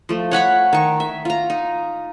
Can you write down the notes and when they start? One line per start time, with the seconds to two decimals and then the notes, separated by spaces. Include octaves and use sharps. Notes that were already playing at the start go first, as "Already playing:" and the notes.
0.09 F3 A3
0.31 C#5 F#5 B5 C#6
0.73 D#3 C#6
1.00 E5
1.25 F4 A#5
1.50 D#4